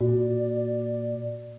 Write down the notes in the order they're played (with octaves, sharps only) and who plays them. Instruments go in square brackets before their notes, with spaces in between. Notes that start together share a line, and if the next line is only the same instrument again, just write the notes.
[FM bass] A#2 [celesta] F#4 [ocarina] D5